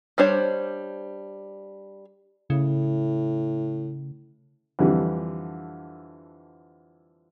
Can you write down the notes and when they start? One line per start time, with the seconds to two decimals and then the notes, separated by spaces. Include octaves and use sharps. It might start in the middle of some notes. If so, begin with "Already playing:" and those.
0.18 G3 D4 C5 C#5
2.50 A2 C#3
4.79 F2 D3 E3 G3